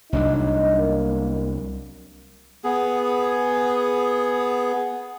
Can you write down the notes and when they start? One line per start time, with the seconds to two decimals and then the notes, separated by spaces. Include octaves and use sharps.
0.13 C2 F#3 D4 D#4
0.79 A#3
2.64 B3 G#4